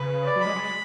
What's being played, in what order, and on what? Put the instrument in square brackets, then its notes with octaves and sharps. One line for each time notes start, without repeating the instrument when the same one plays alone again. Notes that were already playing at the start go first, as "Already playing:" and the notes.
Already playing: [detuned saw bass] C#3 [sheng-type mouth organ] B4
[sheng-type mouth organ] D5
[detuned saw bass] F#3 [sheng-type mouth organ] B5
[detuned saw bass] G#3
G#3